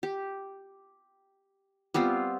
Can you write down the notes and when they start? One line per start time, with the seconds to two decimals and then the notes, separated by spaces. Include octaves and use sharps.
0.03 G4
1.94 G3 B3 C4 F4